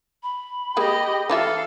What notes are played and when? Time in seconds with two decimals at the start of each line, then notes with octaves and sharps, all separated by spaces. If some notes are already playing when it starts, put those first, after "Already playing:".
0.23 B5
0.77 G#3 A#3 G4 D#5
1.30 E3 F4 A4 E5 F5